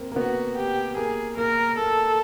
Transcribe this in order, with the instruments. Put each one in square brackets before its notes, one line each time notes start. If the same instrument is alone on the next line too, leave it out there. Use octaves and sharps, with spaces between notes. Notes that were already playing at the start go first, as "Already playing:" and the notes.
Already playing: [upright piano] A#3 C4
A#3
[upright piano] B3 [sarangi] F#4
[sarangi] G4
[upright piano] A#3 [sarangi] G#4
[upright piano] A#3 [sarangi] A#4
[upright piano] A#3 [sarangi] A4